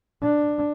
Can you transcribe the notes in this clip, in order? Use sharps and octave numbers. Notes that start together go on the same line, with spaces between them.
D4